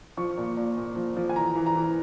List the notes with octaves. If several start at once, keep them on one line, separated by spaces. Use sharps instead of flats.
F3 C#6
A#2
A#2
A#2
F3
F3
G#5
E3 A#5
E3
A#5
E3